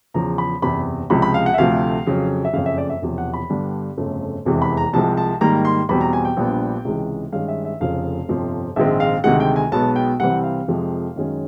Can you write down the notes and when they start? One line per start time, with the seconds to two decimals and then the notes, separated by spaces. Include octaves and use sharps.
0.14 E2 C#3 F3 A#5
0.38 B5
0.62 F#1 E2 C3 B5
1.10 C#2 C3 F3 G#3 B5
1.22 B5
1.34 F5
1.46 F#5
1.54 E5
1.58 D2 C3 F3 A3 F5
2.06 F2 C#3 F#3
2.45 E5
2.53 F#1 F2 C#3 F5
2.66 E5
2.78 D5
2.90 E5
3.02 E1 E2 C3 F3
3.18 F#5
3.34 B5
3.49 G2 D3 G3 B3 D4
3.97 G1 F2 C#3 F3 A3
4.45 F1 E2 C3 E3 G#3
4.62 B5
4.77 A#5
4.93 C2 C3 F3 G#3 A5
5.17 A5
5.41 G#2 D#3 G3 A#3 A#5
5.65 C6
5.89 E2 B2 G3 C4 B5
6.01 A#5
6.13 G#5
6.25 G5
6.37 A#1 A#2 G3 B3 D4
6.85 C#2 C3 E3 G#3
7.32 G2 D#3 G#3 C#4 F5
7.48 E5
7.65 E5
7.80 F1 F2 C#3 F3 F5
8.29 G1 F2 C3 F3
8.76 A#1 G#2 D#3 G#3 C4 E5
9.00 F5
9.24 D2 C3 D#3 G#3 F#5
9.40 G5
9.56 G#5
9.72 B1 B2 G#3 B3 A5
9.96 G5
10.20 C2 C3 E3 G3 C4 F#5
10.44 F5
10.68 F2 C3 F3 G#3
11.16 F#2 D#3 G#3 C#4